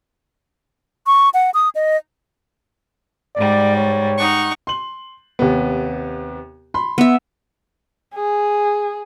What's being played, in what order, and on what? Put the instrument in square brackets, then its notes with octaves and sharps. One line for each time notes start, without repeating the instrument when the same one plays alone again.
[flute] C#6
F#5
D#6
D#5
[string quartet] G#2 G3 [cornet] D5
[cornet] C#5
[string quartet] D#4 F#5 C#6
[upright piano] C6 F#7
D#2 C3 B3
B5 C6
[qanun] B3 E5
[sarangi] G#4